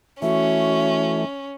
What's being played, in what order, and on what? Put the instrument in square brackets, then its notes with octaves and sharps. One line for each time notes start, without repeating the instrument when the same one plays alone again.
[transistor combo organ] E3 A3 [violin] C#4 [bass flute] F#4 [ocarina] E5